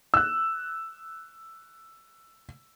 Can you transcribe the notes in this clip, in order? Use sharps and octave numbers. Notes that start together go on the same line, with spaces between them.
E6 F#6